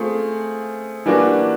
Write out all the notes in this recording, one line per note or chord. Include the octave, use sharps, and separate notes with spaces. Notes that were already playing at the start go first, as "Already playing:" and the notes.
Already playing: A3 C4 F4 G#4
E3 G3 A#3 D4 F#4